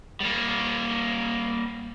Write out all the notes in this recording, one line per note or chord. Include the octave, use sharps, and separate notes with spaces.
G3 A#3